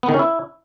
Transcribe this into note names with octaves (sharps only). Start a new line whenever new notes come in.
B3
D#3
C#4
E4